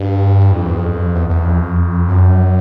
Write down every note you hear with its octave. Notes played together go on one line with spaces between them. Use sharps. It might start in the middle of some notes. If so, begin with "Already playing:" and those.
Already playing: G2
F2
E2
F2
E2
E2
F2
F#2